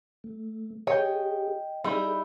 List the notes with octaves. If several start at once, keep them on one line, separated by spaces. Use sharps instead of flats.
A3
G4 G#4 C#5 D#5 G5
G3 D#4 E4 G#4